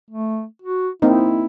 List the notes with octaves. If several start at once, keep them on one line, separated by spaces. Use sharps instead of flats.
A3
F#4
A#3 C4 D#4 E4